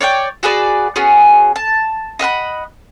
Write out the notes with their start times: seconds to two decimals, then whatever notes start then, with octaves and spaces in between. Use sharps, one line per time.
0.01 C#5 D5 F#5 G5
0.43 F#4 G#4 B4 D5
0.96 B3 C#4 F#4 G#4
1.56 A5
2.19 D#5 E5 F#5 B5